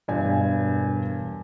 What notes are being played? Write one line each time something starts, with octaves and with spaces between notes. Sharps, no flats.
E1 G2 G#5